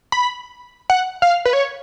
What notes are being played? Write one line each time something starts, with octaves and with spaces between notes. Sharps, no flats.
B5
F#5
F5
B4
C#5